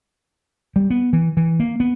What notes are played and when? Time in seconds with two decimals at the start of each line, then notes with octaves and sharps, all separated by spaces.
0.76 G3
0.90 B3
1.13 E3
1.37 E3
1.60 A#3
1.80 B3